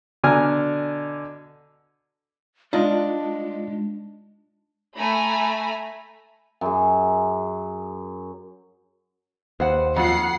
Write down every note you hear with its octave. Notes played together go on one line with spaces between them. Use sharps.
B2 D3 D4 G#5 A#5 F6
G#3 D4 D#4 F4 D#5
A3 G#5 A#5 B5
F#2 G#4
D#2 B4 C5 F#5
F2 F#3 F4 F#5 C7